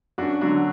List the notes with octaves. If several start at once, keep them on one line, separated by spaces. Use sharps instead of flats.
F#2 D4 F#4
D3 F#3 D4 F#4